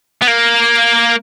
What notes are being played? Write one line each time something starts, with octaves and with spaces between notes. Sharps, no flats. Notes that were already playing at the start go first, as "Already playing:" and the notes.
B3
A#3